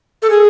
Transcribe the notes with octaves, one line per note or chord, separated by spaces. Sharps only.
A4
G#4